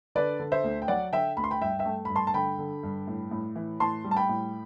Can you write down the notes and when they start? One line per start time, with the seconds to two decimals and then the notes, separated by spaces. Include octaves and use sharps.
0.15 D3 B4 D5
0.39 D3
0.52 C5 E5
0.64 D2
0.82 G5
0.88 F#3 D5 F#5
1.12 D3 E5 G5
1.37 D2 B5
1.44 C6
1.51 G5 B5
1.61 G2 E5 G5
1.79 E5 G5
1.86 A3
2.05 G2 B5
2.16 A5 C6
2.27 A5
2.34 D3 G5 B5
2.59 D3
2.83 G2
3.07 A2
3.31 A2
3.56 E3
3.80 A2 A5 C6
4.05 G3
4.11 A5
4.16 G5 B5
4.29 A2